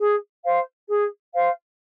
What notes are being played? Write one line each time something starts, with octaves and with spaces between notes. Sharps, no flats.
G#4
C5 F5
G#4
C5 F5